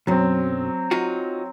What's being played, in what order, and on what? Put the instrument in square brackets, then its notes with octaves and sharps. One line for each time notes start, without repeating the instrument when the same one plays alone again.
[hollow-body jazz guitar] B1 F#2 [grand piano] F#3 C4
[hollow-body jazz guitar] D#4 F4 F#4